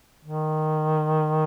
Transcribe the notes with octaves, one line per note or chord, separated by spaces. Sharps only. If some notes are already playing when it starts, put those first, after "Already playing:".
D#3